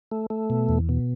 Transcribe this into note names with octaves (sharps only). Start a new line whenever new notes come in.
A3
A3
B2
E2
B2